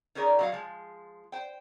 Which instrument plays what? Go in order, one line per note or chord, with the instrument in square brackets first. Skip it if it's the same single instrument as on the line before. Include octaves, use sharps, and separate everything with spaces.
[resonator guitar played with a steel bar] D#3 C#4 G#4 A#4 D5
F#3 G3 D#4 F4 C#5 F5
F3 G#3
C5 G5